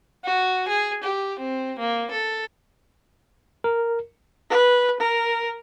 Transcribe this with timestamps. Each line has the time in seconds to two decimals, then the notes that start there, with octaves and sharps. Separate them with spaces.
0.24 F#4
0.68 G#4
1.03 G4
1.39 C4
1.78 A#3
2.11 A4
3.64 A#4
4.50 B4
5.00 A#4